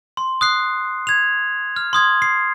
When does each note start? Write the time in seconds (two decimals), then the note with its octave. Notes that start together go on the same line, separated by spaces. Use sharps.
0.17 C6
0.41 D#6 F#6 C7
1.07 G#6 F7
1.76 F6
1.93 C6 D#6 G#6
2.22 C7